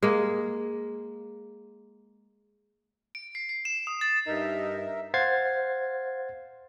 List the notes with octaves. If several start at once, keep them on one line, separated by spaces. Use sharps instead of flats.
G#3 A#3
D7
C7
C7
E7
D#6
A6
G2 D#4 A#4 E5
C5 F5 F#5 G#6 A6 C7